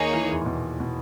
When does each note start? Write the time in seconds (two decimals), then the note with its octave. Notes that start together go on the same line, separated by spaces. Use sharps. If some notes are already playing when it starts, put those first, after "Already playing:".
Already playing: D#2 D#3 A#3 D#4 G#4 C#5
0.14 E3
0.23 D#3
0.31 E2 E3
0.41 A#2
0.46 B2
0.80 B2